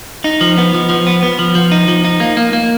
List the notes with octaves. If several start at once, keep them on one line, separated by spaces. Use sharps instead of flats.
D#4
F3
B3
F3
F3
B3
B3
F3
F3
D#4
F3
D#4
A#3
A#3
A#3